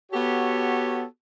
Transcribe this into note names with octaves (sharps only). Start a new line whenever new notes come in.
B3 F#4 G4 A4 C#5